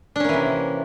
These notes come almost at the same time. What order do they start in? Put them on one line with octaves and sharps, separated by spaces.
D4 C#4 A#3 E3 C3